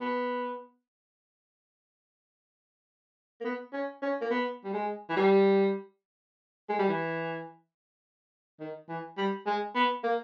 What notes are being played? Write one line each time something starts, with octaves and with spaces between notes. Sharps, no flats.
B3
A#3
B3
C#4
C#4
A#3
B3
G3
G#3
E3
G3
G#3
G3
E3
D#3
E3
G3
G#3
B3
A#3